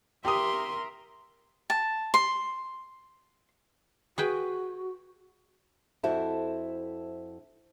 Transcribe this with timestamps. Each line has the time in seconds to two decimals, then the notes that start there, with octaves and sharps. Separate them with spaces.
0.25 G4 A#4 E5 C6 D#6
1.70 A5
2.14 C6
4.18 F#4 G#4 B4 G5
6.03 F2 E4 F#4 C5 E5 A5